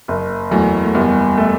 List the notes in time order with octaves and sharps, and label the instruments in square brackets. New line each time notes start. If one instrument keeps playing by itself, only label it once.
[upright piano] F#1
[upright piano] E2 [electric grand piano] F#3 A3
[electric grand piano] A3
[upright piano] F#1 [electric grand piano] G3 B3
[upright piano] A3